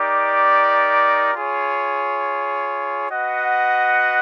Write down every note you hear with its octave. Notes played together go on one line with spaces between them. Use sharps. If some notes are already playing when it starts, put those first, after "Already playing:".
Already playing: D#4 G4 A#4 D5
F4 G#4 C#5
F#4 B4 D#5 F#5